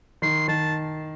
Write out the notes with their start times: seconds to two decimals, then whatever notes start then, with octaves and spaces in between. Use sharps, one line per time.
0.22 D#3 C6
0.48 D#3 A5